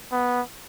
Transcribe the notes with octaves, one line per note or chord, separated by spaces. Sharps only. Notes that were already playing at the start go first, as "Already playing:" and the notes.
B3